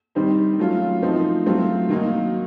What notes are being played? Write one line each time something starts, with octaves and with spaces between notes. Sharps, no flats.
D#3 G3 C4 D#4
F#3 A3 C#4 F4
F3 A3 C4 D#4
F#3 A3 C4 F4
D#3 F#3 A#3 D#4